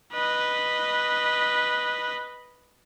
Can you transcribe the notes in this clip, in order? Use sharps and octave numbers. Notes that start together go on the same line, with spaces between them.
B4 D#5